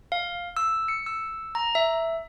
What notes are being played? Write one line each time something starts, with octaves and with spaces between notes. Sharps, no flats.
F5
E6
C#7
E6
A#5
E5